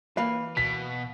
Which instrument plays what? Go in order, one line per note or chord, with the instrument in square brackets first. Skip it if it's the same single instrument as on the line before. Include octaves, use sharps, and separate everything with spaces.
[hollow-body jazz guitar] E3 A#3 B4 [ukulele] F5
[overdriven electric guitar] B2 [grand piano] B6